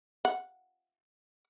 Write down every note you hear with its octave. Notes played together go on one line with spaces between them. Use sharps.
F#5